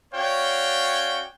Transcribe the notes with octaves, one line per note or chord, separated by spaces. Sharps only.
C#4 F#4 C#5 D5 F5 G5